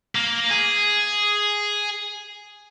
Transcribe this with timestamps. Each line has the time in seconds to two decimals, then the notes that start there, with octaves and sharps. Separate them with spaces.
0.15 A#3
0.50 G#4